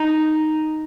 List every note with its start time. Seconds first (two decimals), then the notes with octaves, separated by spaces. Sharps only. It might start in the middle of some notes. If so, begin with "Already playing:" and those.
Already playing: D#4